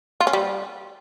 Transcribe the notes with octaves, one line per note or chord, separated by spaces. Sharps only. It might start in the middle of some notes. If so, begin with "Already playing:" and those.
F4
C#4
G3